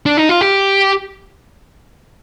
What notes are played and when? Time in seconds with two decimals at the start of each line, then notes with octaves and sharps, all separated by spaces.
0.06 D4
0.17 D#4
0.29 F4
0.41 G4